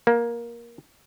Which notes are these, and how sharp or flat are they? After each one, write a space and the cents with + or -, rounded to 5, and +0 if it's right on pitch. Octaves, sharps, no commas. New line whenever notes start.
A#3 +15